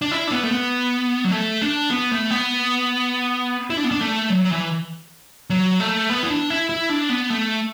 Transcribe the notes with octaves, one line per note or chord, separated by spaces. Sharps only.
D4
E4
D4
B3
A3
B3
F#3
A3
D4
B3
A3
B3
E4
D4
B3
D4
A3
F#3
F#3
E3
F#3
A3
B3
E4
D4
E4
E4
D4
B3
A3